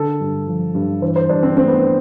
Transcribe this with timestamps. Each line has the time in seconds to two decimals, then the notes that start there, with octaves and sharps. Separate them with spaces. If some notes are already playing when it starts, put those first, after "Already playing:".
Already playing: D3 A4
0.20 G2
0.47 F3
0.75 G2
1.02 E3 C5
1.16 C5
1.29 G2 D4
1.43 C4
1.57 A3 C4
1.67 B3